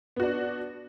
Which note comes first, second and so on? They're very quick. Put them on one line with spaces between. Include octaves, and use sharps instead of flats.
B3 F#4 D4